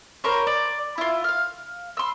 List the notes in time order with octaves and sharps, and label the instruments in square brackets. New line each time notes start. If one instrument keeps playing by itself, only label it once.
[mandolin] A#4 C5 C#5
D5
E4 F4
F5 F6
C6 E6